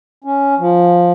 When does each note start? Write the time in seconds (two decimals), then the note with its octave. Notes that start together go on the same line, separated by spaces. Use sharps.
0.24 C#4
0.59 F3